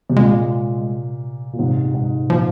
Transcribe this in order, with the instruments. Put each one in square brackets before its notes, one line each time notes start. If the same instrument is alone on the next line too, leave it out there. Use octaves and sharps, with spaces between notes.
[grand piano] C3
[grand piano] A#2 [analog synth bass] G#3
[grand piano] A#2
G#2 C3
G#2
[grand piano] A#2 [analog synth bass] F3